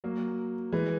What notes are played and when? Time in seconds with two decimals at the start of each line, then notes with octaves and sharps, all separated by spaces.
0.04 F#3 A#3
0.72 E3 G#3